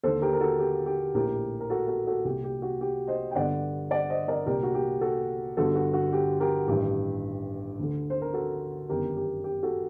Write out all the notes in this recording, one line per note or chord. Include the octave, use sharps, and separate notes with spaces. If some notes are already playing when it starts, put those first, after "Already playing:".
D#2 D3 A4 C5
G4 A#4
A#4
F#4 A4
G4
G4
A#1 A2 G4 A#4
A#4
F#4 A4
F#4 A4
F#4 A4
C2 A#2 G4
G4
F#4
G4
C5 D#5
G5
G1 G2 D3 D5 F#5
D5 F#5
C5 D#5
A#4 D5
C2 A#2 G4 A#4
F#4
G4
F#4 A4
G1 G2 D3 F#4 A4
F#4
F#4
G4
G4 A#4
A1 G2 D#3 G4
D2 D3
C5
A#4
F#4 A4
G1 F#2 D#3 G4 A#4
G4
G4
F#4 A4